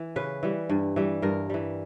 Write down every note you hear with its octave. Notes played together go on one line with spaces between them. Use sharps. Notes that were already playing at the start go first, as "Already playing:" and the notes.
Already playing: E3
C#3 B4
E3 G3
G2
E3 G3
G2 A#4
E3 G3